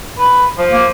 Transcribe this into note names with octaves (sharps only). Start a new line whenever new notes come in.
B4
F3
A#3